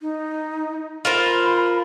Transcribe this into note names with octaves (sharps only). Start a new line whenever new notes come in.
D#4
F4 A#4 C5 B5